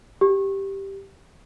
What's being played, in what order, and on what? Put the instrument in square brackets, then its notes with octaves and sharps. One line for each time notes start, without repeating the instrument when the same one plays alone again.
[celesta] G4